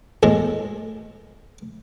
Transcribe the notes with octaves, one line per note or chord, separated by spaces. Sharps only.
E2 A2 G#3